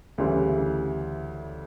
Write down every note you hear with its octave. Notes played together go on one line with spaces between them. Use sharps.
D2 C#3 E3 G3